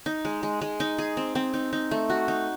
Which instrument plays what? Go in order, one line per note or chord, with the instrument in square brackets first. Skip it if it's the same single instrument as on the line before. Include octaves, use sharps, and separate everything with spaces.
[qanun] D#4
G#3
G#3
G#3
D#4
G#4
C4
C4
D#4
D#4
A3
F#4
D#4